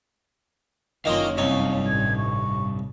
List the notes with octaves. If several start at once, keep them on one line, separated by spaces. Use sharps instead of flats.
F#1 D#3 C#4 F4 A#4 D#5 F5 C6
C2 G2 D#4 C#5 F5
A1 G#6
C#6